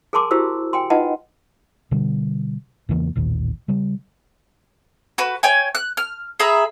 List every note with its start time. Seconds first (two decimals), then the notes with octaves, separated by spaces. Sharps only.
0.13 G#4 A#4 G#5 A5 C6 D6
0.31 E4 F#4 G4 C5 E6
0.73 G5 G#5 C6
0.90 D#4 F4 B4 D#5 F#5 A5
1.91 B2 D3 G3
2.89 E2 C#3 E3 A#3
3.16 A1 D#2 A#2 D#3
3.68 C#3 G3
5.18 F#4 B4
5.43 C#5 G5 G#5
5.75 F#6
5.97 F6
6.40 G#4 E5 A#5 B5